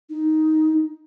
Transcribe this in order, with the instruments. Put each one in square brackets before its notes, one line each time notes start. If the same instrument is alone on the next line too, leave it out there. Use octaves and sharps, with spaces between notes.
[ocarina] D#4